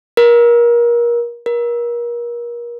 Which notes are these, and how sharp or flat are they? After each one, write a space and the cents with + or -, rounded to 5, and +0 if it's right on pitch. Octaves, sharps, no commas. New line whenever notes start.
A#4 +30
A#4 +35